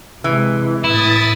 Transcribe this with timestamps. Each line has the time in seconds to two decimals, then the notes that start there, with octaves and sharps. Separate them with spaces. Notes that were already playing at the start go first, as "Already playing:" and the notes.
0.24 C3 E3 G#3
0.84 A2 E4 D#6 A6